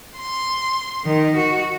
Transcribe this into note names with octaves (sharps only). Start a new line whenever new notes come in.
C6
D#3
F#4